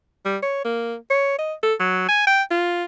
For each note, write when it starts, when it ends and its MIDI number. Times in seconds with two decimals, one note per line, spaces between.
0.26 0.37 55
0.43 0.61 73
0.65 0.95 58
1.10 1.39 73
1.39 1.54 75
1.63 1.74 69
1.80 2.07 54
2.09 2.26 80
2.27 2.43 79
2.51 2.84 65